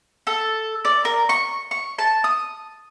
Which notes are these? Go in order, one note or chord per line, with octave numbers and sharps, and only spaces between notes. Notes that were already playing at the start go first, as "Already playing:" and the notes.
A4
D5
A#4
C#6
C#6
A5
D#6